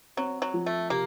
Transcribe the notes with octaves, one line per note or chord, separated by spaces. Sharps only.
F#3 C4
F#3
F3
A3
C3 A#3